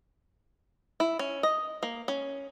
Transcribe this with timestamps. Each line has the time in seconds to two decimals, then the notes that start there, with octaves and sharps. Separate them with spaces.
1.00 E4
1.19 C#4
1.43 D#5
1.83 A#3
2.08 C#4